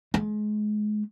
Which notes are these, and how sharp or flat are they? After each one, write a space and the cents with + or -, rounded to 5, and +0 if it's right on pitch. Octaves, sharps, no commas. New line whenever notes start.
G#3 +25